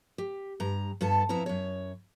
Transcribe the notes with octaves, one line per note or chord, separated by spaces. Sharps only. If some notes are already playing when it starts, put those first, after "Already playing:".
G4
G2 A#5
G2 B3 A4 A5
F2 B3 C4 E4 A#5
F#2 C#5